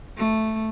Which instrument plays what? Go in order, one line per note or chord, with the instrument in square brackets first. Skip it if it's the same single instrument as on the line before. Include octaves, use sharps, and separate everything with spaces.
[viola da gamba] A3